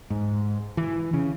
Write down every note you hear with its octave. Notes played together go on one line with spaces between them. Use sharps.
G#2
E3
C#3